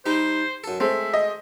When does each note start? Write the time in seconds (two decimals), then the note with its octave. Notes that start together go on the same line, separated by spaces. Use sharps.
0.06 G3 D#4 C5
0.64 F#2 A4
0.80 G#3 A3 C4 E5
1.14 D#5